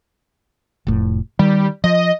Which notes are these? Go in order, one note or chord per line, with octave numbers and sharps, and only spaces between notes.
F1 A2
D#3 G3
F3 D#5